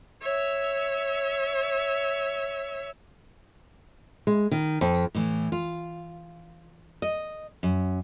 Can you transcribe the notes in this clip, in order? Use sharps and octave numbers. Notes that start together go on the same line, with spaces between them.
C#5 E5
G#3
D#3
F2
A2 E3
F4
D#5
F#2